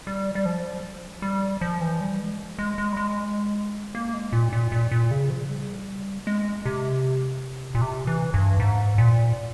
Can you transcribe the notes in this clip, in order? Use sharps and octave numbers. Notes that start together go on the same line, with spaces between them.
G3
G3
F3
G3
F3
E3
G3
G#3
G#3
G#3
G3
G#3
A#3
G#3
A#2
A#2
A#2
A#2
C#3
F3
G3
G#3
C3
A#2
C3
E3
G2
G#2
A#2